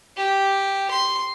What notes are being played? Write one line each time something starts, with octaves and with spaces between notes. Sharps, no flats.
G4
C6